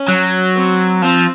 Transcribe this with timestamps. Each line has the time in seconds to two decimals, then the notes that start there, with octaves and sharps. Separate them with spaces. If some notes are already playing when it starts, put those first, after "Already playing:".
Already playing: C#4
0.08 F#3
0.56 C4
1.02 F3 C4